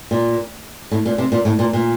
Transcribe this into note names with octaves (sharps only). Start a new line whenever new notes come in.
A#2
A2
A#2
C3
A#2
A2
A#2
A#2